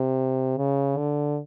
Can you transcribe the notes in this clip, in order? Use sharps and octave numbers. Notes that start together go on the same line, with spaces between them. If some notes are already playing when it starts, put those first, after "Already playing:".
Already playing: C3
C#3
D3